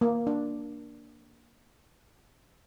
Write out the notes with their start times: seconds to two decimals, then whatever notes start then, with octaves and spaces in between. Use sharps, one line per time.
0.01 A#3
0.27 D4